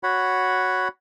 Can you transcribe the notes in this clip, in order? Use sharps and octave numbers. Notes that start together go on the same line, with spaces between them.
F#4 C#5 F#5 B5